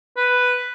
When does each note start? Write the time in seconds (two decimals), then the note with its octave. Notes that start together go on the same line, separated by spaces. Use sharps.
0.17 B4